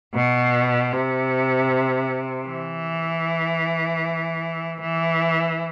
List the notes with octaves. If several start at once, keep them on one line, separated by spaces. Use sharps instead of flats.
B2
C3
E3
E3